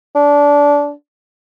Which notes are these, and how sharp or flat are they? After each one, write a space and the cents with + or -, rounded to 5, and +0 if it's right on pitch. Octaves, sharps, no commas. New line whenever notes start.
D4 -20